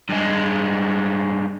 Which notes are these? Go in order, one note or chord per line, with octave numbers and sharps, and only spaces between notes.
G2 G#3